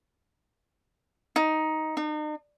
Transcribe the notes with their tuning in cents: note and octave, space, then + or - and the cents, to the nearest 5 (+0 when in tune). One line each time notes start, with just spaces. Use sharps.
D#4 +10
D#4 -40